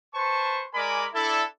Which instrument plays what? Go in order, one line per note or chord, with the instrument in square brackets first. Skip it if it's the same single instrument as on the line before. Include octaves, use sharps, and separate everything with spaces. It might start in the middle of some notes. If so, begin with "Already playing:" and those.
[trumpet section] B4 C5 A5 C#6
G#3 A#4 D5 G#5 B5 D6
D4 E4 A4